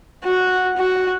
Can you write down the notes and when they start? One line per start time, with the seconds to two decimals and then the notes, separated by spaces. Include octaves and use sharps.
0.24 F#4
0.77 F#4